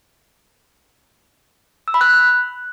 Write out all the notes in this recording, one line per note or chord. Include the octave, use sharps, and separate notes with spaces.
E6
B5
F#6